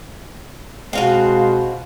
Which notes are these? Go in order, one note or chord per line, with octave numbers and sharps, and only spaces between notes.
B2 G#3 C4 F4 F#4 F5